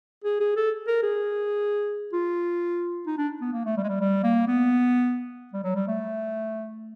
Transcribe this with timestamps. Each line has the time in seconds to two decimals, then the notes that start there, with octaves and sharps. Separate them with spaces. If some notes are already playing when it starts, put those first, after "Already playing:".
0.24 G#4
0.40 G#4
0.57 A4
0.87 A#4
1.03 G#4
2.13 F4
3.06 D#4
3.18 D4
3.41 B3
3.53 A#3
3.65 A3
3.77 G3
3.83 G#3
3.88 G3
4.01 G3
4.23 A#3
4.48 B3
5.53 G3
5.64 F#3
5.76 G3
5.88 A3